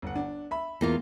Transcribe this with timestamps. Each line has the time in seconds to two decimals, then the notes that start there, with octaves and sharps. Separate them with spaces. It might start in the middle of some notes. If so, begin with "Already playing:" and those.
0.02 G1 F#5
0.16 D4
0.51 E5 B5
0.81 E2 A#3 F4